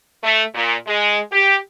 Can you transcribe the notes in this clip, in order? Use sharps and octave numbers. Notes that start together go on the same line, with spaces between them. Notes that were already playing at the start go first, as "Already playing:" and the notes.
A3
A#2
G#3
G4